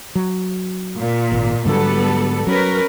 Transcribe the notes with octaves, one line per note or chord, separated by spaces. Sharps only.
F#3
A#2
G#1
G#2 D3 F#3 G3 B3 A4
F#3 C#4 A#4 B4